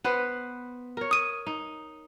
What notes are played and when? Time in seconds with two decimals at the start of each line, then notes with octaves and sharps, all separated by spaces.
0.04 B3 B4 C5
0.97 A#4 C#5
1.11 D#6 D#7
1.47 D#4